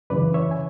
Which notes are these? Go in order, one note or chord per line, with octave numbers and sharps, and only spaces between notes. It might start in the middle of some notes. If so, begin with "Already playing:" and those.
F#2 C#3 E3 B4 D5
C#5 E5
G#5